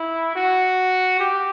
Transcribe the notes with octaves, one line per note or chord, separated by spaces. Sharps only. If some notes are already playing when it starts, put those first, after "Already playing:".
Already playing: E4
F#4
G4